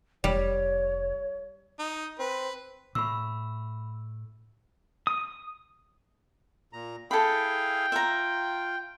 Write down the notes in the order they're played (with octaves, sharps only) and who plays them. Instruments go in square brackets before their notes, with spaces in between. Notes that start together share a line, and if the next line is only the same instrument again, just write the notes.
[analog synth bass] F1 [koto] G3 [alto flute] C#5
[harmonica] D#4
[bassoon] C4 [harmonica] B4
[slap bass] A2 [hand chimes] B5 E6
[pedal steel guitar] D#6
[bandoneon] A#2 A#5
[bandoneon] E4 G#4 F5 [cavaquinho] A4 B5 [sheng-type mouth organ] G5
[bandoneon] F4 [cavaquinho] E5 A#5